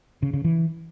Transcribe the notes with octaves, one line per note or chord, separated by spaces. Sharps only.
C#3
C#3
E3